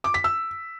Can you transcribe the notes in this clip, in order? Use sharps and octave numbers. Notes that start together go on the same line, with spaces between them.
D6
B6
E6